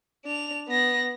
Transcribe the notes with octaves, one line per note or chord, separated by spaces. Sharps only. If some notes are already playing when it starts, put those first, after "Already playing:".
D4 F7
B3 A#6